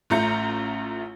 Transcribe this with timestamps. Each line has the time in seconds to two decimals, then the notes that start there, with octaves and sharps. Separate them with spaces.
0.10 A1 A3 F4 A#5 G6 C#7